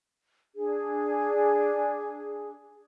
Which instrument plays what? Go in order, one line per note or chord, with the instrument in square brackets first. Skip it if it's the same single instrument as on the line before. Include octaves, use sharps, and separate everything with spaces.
[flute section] D4 G#4